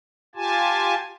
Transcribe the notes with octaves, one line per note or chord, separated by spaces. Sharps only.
F4 G4 G#5 A5